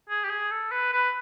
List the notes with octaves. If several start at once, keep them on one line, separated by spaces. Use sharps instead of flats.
G#4
G4
G#4
A4
B4
B4